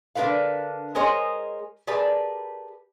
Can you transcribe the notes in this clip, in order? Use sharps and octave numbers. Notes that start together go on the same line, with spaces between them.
D3 D4 F4 A#4 B4 F5
G#3 G#4 A#4 C5 C#5 D#5
G4 G#4 A#4 B4 D5 A5